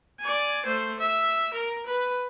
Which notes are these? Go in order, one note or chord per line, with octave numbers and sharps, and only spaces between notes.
D5 G#5
A3 C5
E5
A#4
B4